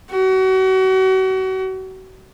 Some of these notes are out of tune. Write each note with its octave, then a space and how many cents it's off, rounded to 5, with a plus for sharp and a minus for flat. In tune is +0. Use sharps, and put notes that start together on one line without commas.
F#4 +35